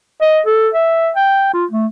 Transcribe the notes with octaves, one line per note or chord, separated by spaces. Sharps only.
D#5
A4
E5
G5
F4
A3